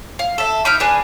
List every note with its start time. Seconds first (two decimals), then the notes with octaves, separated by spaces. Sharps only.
0.19 F5
0.38 A4 E5
0.65 D#4 B5 D6 F6
0.80 D4 G#4 B4